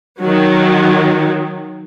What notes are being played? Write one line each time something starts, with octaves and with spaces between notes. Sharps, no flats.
D#3 F#3